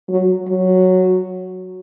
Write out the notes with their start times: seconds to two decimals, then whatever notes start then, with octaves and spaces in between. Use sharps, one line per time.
0.09 F#3
0.49 F#3